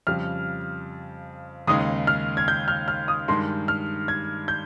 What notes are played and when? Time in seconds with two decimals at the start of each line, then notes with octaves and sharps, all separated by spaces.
0.07 F2 C#3 G3 F6
1.67 D#2 C#3 G#3 D#4 D#6
2.07 F6
2.37 G#6
2.48 G6
2.68 F6
2.88 F6
3.08 D#6
3.28 G2 D#3 G#3 C6
3.68 F6
4.08 G#6
4.48 G6